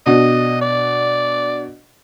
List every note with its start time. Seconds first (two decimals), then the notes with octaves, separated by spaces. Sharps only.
0.06 B2 D4 D#5
0.61 D5